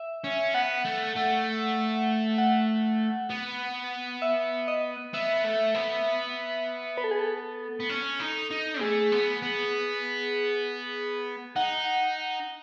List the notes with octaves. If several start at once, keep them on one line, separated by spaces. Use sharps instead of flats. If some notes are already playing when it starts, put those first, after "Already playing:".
Already playing: E5
C#4
B3 F#5
A3
A3
F#5
B3
E5
D#5
B3 E5
A3
B3
B4
A4
G#4
A4
B3
C#4
D#4
D#4
A3 G#4
B3
B3
D#4 F#5